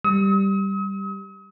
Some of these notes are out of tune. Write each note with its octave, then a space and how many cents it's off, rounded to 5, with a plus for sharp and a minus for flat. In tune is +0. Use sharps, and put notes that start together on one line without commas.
G3 +0 D#6 +45